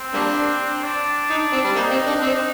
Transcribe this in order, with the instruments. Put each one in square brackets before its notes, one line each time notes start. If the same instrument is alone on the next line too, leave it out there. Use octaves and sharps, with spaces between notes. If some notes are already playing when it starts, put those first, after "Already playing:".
Already playing: [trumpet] C4
[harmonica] G3 A#3 D4
[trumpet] D4
[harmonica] D#4
C4
G3
[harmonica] A#3 [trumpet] D#4
[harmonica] C4
D4
C4